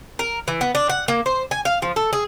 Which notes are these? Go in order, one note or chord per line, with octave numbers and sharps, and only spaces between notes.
A#4
E3
B3
D4
F#5
A#3
C5
G#5
F5
F3
A4
G#4